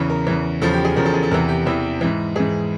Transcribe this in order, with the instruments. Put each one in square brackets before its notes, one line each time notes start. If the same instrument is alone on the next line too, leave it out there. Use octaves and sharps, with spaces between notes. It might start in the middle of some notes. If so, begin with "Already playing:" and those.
Already playing: [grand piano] E2 C#3 E3
A#4
E2 C#3 E3
E2 C#3 F3 A4
G4
G#4
E2 C#3 F3 A#4
A4
G#4
A4
E2 C3 E3 A#4
G4
E2 C3 E3
G#2 E3
G#2 E3 G#4